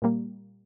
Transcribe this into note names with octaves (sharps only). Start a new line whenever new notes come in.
A#2 G3 A#3